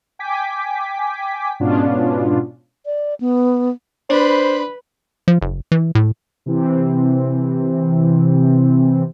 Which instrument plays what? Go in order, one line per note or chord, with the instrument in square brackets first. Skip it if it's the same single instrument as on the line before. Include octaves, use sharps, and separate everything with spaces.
[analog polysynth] G5 G#5 D6 B6
G#2 B2 B3 C#4 D4 F4
[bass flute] D5
B3
[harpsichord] D4 [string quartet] B4 B5 [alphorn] C5
[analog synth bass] F3
F#1
E3
A2
[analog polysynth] C3 E3 C4